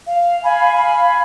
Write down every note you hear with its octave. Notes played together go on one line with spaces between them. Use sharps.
F5
F5 G#5 B5
B5